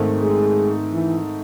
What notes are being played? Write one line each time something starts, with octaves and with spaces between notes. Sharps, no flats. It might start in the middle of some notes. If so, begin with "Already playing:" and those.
Already playing: G#2 D#3 A3 C4
G#3
E3